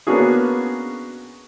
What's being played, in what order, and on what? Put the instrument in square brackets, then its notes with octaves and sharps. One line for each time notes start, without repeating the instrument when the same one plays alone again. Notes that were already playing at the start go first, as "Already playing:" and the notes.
[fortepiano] A#3 B3 C#4 D4 F#4 G#4